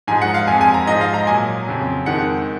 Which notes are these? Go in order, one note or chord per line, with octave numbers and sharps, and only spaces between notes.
G#2 F3 G#3 G#5
F#5
F5
F2 F3 G#3 G#5
G#5
A#5
G#2 F3 G#3 D#5
F5
A#5
A#2 F#3 G#5
F2 C#3 F#3
F2 D#3 G#3 F#5